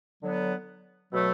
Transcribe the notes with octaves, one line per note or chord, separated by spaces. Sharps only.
D3 F#3 B3
B2 F#3 A3